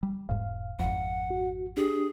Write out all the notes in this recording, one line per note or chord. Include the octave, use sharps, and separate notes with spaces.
G3
E1 G#2 F5
G#1 F2 F#5
F#4
D4 G4 G#4